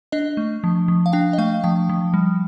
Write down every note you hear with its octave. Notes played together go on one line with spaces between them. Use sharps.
D4 D#5
A3
F3
F3
F5
D4 G5
D#5
A3 F5
F3 G5
F3
G3